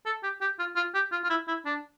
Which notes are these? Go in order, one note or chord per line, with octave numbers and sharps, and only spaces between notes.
A4
G4
G4
F4
F4
G4
F4
F4
E4
E4
D4